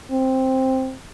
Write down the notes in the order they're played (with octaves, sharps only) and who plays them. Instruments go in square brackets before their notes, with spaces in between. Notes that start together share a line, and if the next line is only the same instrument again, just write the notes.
[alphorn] C4